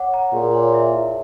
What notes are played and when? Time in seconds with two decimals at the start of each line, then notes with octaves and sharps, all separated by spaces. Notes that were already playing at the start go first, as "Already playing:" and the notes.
Already playing: C#5 F#5 D6
0.14 A#5
0.33 A#2 G#4
0.54 C#5
0.74 E5
0.94 E4